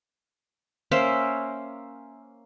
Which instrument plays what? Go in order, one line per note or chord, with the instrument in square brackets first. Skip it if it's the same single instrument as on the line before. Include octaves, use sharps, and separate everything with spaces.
[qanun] A#3 C#4 C5 E5